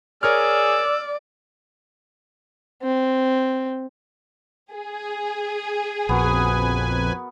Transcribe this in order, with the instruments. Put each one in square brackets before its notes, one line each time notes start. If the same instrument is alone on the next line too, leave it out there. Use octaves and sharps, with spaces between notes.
[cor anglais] G#4 [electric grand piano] A#4 C#5 F6 [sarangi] D5 [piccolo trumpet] E6
[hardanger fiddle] C4
[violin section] G#4
[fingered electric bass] A#1 [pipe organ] F2 B4 G#5 [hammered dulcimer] B3 F#4 A#4